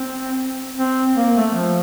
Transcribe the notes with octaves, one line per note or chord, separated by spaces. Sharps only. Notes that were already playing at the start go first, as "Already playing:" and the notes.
Already playing: C4
C4
A#3
A3
F3